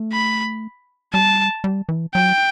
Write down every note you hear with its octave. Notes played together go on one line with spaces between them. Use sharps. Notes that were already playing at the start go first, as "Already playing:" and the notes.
Already playing: A3
B5
G3 A5
G3
E3
F#3 G5